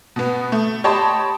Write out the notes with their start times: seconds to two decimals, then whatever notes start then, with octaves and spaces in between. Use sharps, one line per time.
0.16 B2 B3
0.52 A3
0.84 G4 C#5 D#5 A5 B5 C6